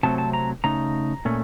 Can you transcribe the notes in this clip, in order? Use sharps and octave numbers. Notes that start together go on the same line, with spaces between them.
C3 F#3 A3 C4 A5
A5
A#5
C#3 A3 D#4 A#5
A#2 A3 C#4